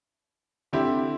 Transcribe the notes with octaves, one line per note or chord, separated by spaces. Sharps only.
D3 C4 E4 G4